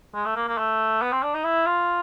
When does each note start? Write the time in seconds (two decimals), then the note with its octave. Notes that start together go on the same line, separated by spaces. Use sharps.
0.14 G#3
0.25 A3
0.36 A#3
0.48 A#3
0.58 A3
1.02 B3
1.12 C4
1.23 D4
1.34 D#4
1.44 E4
1.66 F4